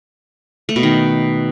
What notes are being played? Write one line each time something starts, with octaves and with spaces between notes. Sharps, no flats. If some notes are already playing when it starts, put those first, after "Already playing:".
A3
B2
D#3